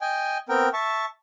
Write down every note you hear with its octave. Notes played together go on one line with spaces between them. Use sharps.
D#5 G5 G#5
B3 C4 A#4 G5
E5 A5 C#6